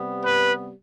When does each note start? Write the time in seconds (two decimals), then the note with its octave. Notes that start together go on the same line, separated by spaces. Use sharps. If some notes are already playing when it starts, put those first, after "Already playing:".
Already playing: C3 G3 B3
0.25 B4